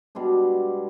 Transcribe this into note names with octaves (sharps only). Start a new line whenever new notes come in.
B2 G3 G#3 D4